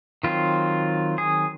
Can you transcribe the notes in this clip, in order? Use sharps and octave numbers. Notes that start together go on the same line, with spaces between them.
D#3 F#3 C4 F4
G#4